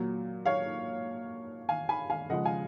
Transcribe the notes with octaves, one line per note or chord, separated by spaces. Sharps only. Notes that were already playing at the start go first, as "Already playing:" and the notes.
Already playing: A#2 F#3
C#5 F5
F5 G#5
G#5 B5
F5 G#5
C#3 F3 G#3 D#5 F#5
F5 G#5